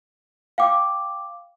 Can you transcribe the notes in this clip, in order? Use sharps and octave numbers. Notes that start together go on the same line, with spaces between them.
F5 G5 D6